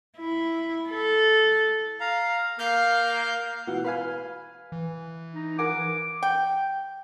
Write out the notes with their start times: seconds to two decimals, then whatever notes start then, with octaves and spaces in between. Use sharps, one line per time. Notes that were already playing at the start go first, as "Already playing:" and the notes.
0.18 E4
0.90 A4
2.00 F5 A#5
2.59 A#3 F5 F6 G6
3.67 B2 E3 F#5
3.85 B4 F5 G#5
4.72 E3
5.35 D#4
5.59 A#4 F#5 G#5 D6
6.23 G5